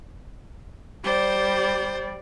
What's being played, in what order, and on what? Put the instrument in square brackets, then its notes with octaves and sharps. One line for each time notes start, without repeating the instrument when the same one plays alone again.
[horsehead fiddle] G3 D5 [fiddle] C5